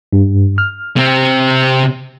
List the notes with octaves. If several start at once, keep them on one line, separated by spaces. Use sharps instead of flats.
G2
F6
C3 C4